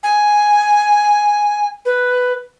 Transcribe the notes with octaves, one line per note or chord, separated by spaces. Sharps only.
G#5
B4